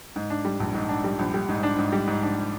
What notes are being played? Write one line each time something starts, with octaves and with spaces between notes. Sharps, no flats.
G#2
D4
G3
A#1
G#2
D4
G3
A#1
G3
G#2
D4
G#2
G3
G#2
D4